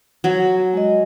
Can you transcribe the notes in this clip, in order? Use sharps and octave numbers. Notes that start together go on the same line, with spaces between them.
F#3
G#3 D#5